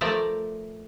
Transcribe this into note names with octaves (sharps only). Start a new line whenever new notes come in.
F3 A3 A#4 D5 E5